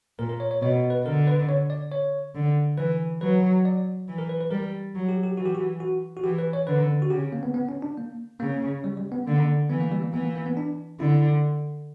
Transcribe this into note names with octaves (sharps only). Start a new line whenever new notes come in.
A#2 A#4
A#4
C#5
C#5
B2 C#5
B4
D3 A#4
B4
C#5
D5
C#5
D3
E3 B4
F#3 B4
D5
E3
A#4
B4
B4
G3 A#4
F#3
G4
G4
E3 F#4
G4
F#4
F#4
F#4
E3 G4
B4
C#5
D3 B4
F#4
C#3 G4
A#3
B3
B3
C#4
D4
A#3
C#3 A#3
G3
G3
B3
D3 A#3
E3 B3
A#3
G3
A#3
E3 B3
A#3
A#3
B3
D4
D3 E4